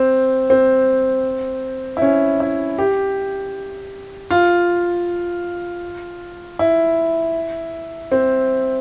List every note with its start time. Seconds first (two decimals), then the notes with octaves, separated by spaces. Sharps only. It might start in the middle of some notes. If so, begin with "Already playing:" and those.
Already playing: C4
0.50 C4
1.97 E4
2.02 C#4
2.40 E4
2.78 G4
4.30 F4
6.59 E4
8.12 C4